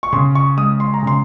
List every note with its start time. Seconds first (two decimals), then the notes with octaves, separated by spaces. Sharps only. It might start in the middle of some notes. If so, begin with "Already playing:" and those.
0.03 C#6
0.13 C#3 C6
0.35 C#6
0.57 G#3 D#6
0.80 C6
0.94 A#5
1.03 C#3 C6